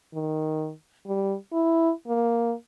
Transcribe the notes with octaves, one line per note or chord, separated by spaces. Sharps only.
D#3
G3
E4
A#3